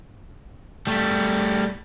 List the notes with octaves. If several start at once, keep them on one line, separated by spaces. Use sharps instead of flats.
G3 A3